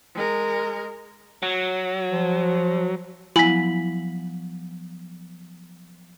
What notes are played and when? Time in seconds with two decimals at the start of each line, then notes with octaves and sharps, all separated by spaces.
0.14 G#3 A#4
1.43 F#3
2.10 F3
3.36 F3 F#3 B3 E4 G#5 B6 F#7